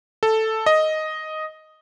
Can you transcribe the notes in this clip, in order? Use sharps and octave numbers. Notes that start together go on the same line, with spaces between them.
A4
D#5